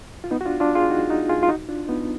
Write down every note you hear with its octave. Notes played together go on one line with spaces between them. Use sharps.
F4
B3 D#4
F#4
D4 F4
D4 F4
F4 G#4
D#4 F#4
D#4 F#4
F4 G#4
F4
D#4 F#4
D4 F4
B3 D#4